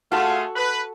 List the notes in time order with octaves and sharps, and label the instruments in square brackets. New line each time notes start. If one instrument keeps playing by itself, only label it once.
[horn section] A3 F4 G#4 [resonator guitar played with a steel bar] F#4 A4
[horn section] B4